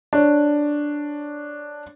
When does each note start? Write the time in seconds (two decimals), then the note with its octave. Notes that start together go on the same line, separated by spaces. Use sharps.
0.13 D4 C#5